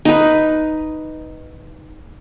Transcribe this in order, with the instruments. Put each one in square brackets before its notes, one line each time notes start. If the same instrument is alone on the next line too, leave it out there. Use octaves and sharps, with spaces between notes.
[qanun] D#4 B4